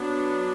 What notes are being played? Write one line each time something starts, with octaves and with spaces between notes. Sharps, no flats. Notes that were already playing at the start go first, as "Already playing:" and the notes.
Already playing: F#3 B3 D4